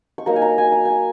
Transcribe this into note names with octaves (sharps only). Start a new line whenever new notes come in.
C#6
F#3 A#3 D#4 A#5
G#5
A#5
G#5
A#5
G#5